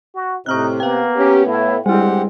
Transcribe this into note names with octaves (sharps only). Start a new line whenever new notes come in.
F#4
A2 C3 C4 D#4 C#6 F6 F#6
A#3 B3 F5 G5
C#4 G4
A2 E4
D2 G2 G3 G#3 C4 E4 G4 F#5